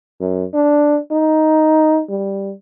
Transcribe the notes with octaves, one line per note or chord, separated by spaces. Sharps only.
F#2
D4
D#4
G3